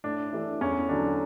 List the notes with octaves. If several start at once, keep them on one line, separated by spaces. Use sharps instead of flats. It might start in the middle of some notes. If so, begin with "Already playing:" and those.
A2 D4
E3 A3 D4
E2 C#4
D3 F#3 D4